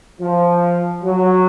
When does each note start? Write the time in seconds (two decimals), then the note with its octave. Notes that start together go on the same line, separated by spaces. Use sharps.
0.21 F3
1.03 F#3